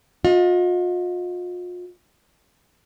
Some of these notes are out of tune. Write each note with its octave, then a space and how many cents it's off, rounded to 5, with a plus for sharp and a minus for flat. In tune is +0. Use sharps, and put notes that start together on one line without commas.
F4 +40 D#5 +15